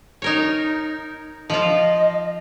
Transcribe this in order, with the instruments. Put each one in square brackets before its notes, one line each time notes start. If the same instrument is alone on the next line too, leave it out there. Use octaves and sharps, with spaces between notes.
[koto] D#4 A#4 C#5
[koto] F3 F4 [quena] D#5